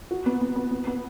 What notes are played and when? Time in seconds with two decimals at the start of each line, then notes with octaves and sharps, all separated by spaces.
0.11 F#4
0.26 B3
0.41 B3
0.56 B3
0.71 B3
0.87 B3